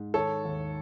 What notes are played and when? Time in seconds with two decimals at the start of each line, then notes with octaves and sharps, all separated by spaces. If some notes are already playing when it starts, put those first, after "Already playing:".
Already playing: G#2
0.14 D#3 A4 C#5
0.45 D#2